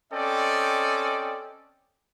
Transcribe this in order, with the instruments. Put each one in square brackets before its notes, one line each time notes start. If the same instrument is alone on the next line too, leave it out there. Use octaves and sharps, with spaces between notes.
[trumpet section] C4 C#4 A4 D5 D#5 G5